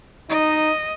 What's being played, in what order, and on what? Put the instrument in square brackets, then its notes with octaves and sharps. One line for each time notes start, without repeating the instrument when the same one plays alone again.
[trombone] D#4 [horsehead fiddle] D#5